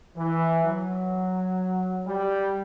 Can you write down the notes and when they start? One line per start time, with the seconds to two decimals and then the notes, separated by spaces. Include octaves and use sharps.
0.16 E3
0.64 F#3
2.07 G3